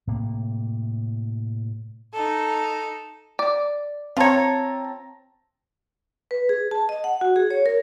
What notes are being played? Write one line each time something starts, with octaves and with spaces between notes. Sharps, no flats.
A2 C3 A#3
D#4 A4
D5
C4 F4 C#5 A5 A#5
B4
G#4
A5
D#5
F#5
F#4
G#4
C#5
A#4